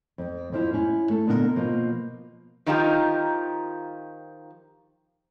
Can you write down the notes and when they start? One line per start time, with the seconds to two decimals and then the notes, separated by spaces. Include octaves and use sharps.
0.18 F2
0.52 F2 F3 E4
0.73 C#4 E4
1.10 A3 A4
1.27 A#2 D3 B3 D#4 E4 A#4
1.56 B2 F3 A#3 F4
2.66 D#3 F3 D#4 F4 G4 A#4